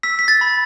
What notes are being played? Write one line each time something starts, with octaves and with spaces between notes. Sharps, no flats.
E6 B6
B6
A6
B5